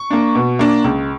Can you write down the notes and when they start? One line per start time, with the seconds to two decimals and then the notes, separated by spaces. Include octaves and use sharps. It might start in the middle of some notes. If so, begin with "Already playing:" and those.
Already playing: C#6
0.10 A#3 D4
0.35 B2
0.59 A#3 D4
0.84 C#2